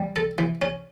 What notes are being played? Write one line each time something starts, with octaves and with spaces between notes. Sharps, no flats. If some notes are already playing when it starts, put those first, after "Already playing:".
Already playing: G3
A4
E3
C#4